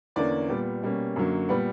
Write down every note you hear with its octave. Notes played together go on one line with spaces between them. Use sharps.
E2 D3 A#3 C#4 D5
A#2 G3 B3
B2 G3 A#3 C#4
F#2 D3 F#3 A#3
A#2 G3 B3 B4